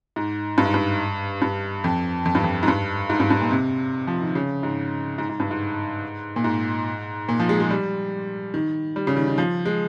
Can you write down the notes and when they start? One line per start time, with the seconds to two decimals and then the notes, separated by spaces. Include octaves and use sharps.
0.16 G#2
0.58 G2
0.65 G#2
0.74 G2
1.42 G2
1.84 F2
2.25 F2
2.35 G2
2.44 F2
2.63 G#2
2.68 G2
3.10 G#2
3.20 G2
3.30 G2
3.41 A#2
3.51 C3
4.07 F3
4.21 D#3
4.35 C#3
4.63 G#2
5.18 G#2
5.29 G#2
5.40 G2
5.51 G#2
6.36 A#2
6.44 G#2
7.28 A#2
7.40 F3
7.49 G#3
7.60 G#3
7.71 G3
8.54 D#3
8.96 G3
9.07 C#3
9.17 D#3
9.28 D#3
9.38 F3
9.66 G#3